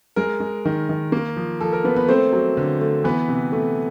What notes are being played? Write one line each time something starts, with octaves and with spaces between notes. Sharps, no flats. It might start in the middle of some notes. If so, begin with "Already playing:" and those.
G#3 A#4
G#3
D#3
D#3
A#3
F3
F3 A4
A#4
A#3 B3 B4
B3 B4
A3 C4 C5
F#3
D3
A3
E3 B3 B4
C3
A3